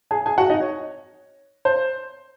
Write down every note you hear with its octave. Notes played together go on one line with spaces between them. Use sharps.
G#4 G#5
G#4 G#5
F#4 F#5
D#4 D#5
C#5
C5